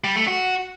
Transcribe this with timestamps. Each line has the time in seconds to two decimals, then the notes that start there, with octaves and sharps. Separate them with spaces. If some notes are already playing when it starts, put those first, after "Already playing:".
0.04 G3
0.16 A3
0.27 F#4